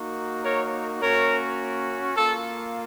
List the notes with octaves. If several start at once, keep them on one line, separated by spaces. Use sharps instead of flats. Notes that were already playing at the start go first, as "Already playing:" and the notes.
Already playing: A#3 D#4 F#4
A#4 C#5
A#3 C#4 F#4 A#4 C#5
A#3 F4 A4